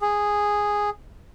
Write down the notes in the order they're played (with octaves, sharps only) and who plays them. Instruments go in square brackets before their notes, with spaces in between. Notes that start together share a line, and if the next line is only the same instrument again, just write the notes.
[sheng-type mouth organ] G#4